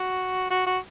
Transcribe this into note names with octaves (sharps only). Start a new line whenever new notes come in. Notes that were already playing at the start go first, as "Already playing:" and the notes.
Already playing: F#4
F#4
F#4